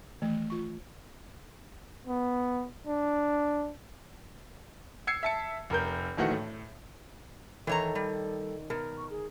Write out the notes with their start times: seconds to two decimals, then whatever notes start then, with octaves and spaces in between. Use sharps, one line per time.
0.22 D#3 E3 A3
0.50 F4 C#6
2.07 B3
2.87 D4
5.07 E6 G#6 C7 C#7
5.23 E5 A5 C#7
5.70 F1 A#4 G6
6.17 A#1 D#3 E3 A3 F#4
6.31 A2
7.67 D#3 E3 A4 C#5 A#5
7.95 G3
8.70 B2 A#4
8.97 C#6
9.10 G#4